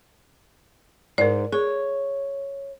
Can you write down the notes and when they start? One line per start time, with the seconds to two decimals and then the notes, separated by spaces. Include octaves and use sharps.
1.18 G#2 A#4 D5
1.52 G#4 C#5